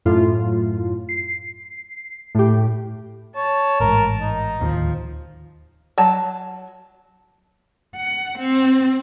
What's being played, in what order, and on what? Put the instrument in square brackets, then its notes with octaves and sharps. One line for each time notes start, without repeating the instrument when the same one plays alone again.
[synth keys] F#2 A2 F4
C7
A2 G4
[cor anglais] C#5 [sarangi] A5
[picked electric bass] A1 G#2 [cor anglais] A#4
[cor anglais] D#4
[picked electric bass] D1 D#2 D#3 [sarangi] F3
[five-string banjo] F#3 A5
[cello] F#5
C4